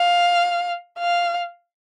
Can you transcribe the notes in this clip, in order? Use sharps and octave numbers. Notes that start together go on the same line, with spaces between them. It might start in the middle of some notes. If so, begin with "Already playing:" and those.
Already playing: F5
F5